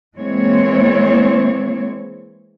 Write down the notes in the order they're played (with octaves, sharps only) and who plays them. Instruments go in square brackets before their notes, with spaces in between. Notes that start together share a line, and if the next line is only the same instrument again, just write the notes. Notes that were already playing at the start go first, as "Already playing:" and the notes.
[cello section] E3 G#3 A#3 C4 C#5